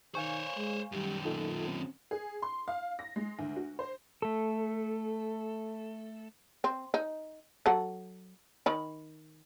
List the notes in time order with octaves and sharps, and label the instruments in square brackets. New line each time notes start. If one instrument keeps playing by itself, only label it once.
[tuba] D#3 [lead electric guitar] C5 C#5 [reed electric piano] F5 G#5 C#6
[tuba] G#3
[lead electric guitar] F#2 D#3 [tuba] G3
[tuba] A#2 [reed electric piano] D#4 F4 A4
[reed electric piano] C4 C#4
[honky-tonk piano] G#4
C6
F5
A#6
G#3
D2
F#4
C5
[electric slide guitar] A3 A4
[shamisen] C4
D#4
F#3 A4 F#5
D#3 B5